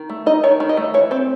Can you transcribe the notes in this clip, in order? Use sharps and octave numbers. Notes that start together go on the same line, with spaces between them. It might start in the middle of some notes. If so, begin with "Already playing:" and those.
Already playing: D#3
A3
D#4 D#5
D#3 C#5
D#3
D#5
A3
E3 C#5
C4 C5